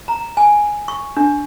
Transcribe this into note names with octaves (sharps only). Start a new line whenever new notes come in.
A#5
G#5
C#6
D4